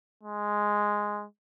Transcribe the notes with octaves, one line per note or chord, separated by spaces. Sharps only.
G#3